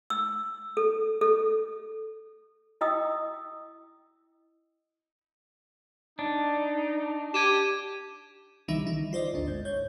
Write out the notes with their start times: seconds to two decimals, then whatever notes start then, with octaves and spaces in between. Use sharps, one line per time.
0.10 E6
0.77 A4
1.21 A4
2.81 E4 D#5 G5 D#6 E6
6.19 D4 D#4
7.34 G4 G#6 D#7 E7
8.68 C2 D#3 E3 G3 D#4 E5
8.84 D#3 D#4
9.13 F4 C5 D5 D#5
9.33 A1 D2 D4
9.48 G#2
9.65 C#5 G6